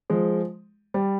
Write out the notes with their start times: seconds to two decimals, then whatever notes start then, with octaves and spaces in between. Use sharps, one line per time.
0.10 F3 G#3
0.94 G3